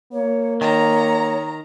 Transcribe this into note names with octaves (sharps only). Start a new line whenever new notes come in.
A#3 C#5
D#3 C#5 A#5